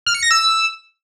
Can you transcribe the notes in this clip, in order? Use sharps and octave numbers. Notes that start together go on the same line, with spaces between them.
F6
C#7
A#6
E6